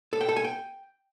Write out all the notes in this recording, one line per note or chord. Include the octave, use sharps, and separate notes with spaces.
A4
G5
A4
G#5
G5